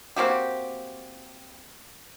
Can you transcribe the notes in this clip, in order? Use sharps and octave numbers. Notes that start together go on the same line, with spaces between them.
A#3 C4 F#4 G4